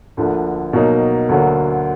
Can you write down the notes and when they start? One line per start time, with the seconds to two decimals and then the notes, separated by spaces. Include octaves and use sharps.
0.17 D2 D3 F3 A#3
0.73 B2 F#3 A#3 D#4
1.29 D2 D3 F#3 A#3